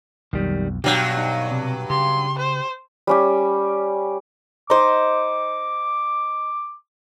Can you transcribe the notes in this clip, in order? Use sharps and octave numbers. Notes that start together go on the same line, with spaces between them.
B1 F2 D#3 G3
G2 B2 F#3 G4
D#4
C3
C#3 G4 C6
C5
G3 C#4 G4
D#4 C5 D6